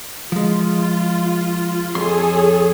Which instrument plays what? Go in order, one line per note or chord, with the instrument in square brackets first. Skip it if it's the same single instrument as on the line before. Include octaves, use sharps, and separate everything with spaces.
[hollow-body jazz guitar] F3 G#3 [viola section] F4
[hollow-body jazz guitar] F2 C6 [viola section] G#4 A4 C#5